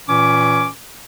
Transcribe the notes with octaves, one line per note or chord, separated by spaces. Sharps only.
A#2 E3 C#4 D6